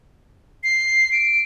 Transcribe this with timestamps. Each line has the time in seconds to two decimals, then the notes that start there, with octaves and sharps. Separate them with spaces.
0.64 C7
1.12 D7